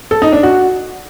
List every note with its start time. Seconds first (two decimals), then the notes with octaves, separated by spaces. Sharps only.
0.11 A4
0.22 D#4
0.33 D4
0.43 F#4